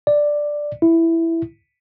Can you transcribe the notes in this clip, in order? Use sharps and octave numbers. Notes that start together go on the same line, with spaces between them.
D5
E4